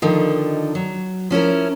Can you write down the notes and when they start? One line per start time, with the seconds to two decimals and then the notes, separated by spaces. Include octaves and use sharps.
0.02 D3 D#3 F3 D#4
0.75 F#3
1.30 F3 C#4 E4 A#4